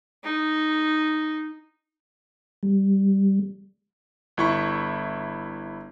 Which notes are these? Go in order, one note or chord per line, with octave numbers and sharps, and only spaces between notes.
D#4
G3
G1 E4 C#6